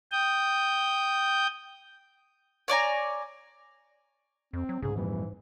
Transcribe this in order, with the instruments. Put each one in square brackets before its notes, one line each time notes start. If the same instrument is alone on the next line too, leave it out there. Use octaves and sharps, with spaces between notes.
[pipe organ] G5 D#6 G6
[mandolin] C#5 D5 G#5 A#5
[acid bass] F2 [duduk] C4
[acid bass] F#3
[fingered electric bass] C2 C#3 [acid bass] G#2 [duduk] G#4
[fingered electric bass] F2 A#2 G3 [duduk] E3